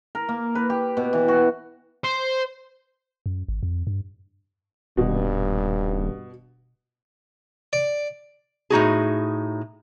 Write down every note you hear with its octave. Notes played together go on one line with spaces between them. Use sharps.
A#4
A#3
B4
G4
B2
E3
F#4
C5
F#2
G#1
F2
G2
D#1 G2 B2
D5
A2 D#4 F#4 G#4